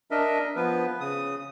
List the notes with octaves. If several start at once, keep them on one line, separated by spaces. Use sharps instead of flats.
D4 A#4 D#5 E5
F3 B3 B4
C#3 D#6